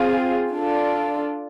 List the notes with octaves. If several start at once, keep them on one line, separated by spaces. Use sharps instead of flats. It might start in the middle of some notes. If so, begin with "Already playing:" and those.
Already playing: C4 F4 G#4
D4 F4 A4